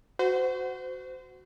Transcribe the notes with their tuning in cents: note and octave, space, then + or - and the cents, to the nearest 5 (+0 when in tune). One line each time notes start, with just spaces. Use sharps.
F#4 +0 C5 -30